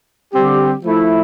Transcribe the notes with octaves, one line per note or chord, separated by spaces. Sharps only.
D3 G3 C4 G4
F3 A3 E4